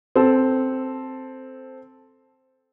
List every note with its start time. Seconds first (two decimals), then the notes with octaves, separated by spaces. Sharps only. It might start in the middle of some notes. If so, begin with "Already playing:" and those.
0.16 C4 A4